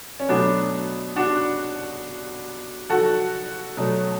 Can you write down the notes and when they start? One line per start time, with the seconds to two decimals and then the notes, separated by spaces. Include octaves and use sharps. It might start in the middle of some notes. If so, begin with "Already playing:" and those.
0.20 C#4
0.29 B2 F#3 A3 B3 D4
1.16 D4 F#4
2.90 F#4 A4
3.77 B2 F#3 A3